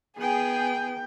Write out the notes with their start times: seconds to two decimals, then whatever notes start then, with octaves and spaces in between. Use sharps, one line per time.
0.17 B3 G#4 G5